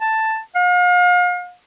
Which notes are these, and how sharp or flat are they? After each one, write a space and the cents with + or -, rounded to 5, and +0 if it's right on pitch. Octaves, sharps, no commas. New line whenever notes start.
A5 +5
F5 +40